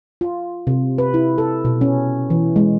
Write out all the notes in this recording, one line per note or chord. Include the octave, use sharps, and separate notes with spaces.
F4
C3
B4
E4
A4
B2
C#4
E3
G#3